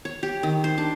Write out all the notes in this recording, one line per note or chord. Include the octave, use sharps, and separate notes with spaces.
C#5
G4
D#3
C5
D4